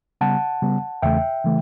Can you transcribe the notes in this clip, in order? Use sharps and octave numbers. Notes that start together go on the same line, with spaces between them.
C#3 G3 B3 F#5 A5
C#3 G3 B3
E2 C#3 E3 A3 E5 G5
C#3 E3 A3